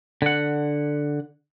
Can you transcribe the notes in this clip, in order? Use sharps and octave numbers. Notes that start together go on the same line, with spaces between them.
D3 F#5